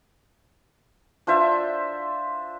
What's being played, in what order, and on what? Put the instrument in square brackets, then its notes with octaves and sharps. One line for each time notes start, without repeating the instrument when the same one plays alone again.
[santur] D4 F4 C5 E5